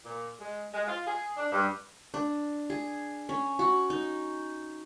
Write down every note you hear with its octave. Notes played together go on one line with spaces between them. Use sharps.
A#2
G#3
G#3
F4
G#4
D4
G2
D4
G#4
C#4
F#4
D#4